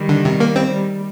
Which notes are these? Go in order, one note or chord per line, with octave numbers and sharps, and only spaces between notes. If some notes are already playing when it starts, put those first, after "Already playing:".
Already playing: D#3 G3
D3
C3
A#3
C4
D#3 G3